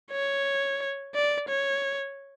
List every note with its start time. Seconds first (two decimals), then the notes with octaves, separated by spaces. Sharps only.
0.11 C#5
1.15 D5
1.49 C#5